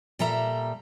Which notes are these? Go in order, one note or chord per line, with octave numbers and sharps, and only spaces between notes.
A#2 G3 A4 E5 A#5